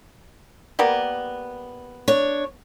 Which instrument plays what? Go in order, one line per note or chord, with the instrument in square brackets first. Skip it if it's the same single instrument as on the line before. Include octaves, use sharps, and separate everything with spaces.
[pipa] G3 A#3 B3
[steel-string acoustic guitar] D4 C#5